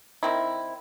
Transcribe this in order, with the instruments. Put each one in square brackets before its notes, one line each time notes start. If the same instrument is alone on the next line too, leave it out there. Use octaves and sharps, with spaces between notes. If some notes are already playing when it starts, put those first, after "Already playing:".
[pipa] D#3 C4 E4